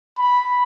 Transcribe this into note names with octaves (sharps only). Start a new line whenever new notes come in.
B5